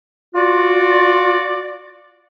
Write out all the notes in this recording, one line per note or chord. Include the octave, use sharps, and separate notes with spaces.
F4 F#4 D5